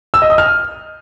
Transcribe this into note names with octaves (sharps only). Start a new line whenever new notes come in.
E6
D#5
D#6
F6